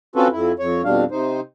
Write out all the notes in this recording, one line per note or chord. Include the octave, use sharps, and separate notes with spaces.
C4 C#4 F4 F#4 A4 B4
F2 E4
F2 C#5
F2 B2 G3 D4 F5
C3 D#4 C5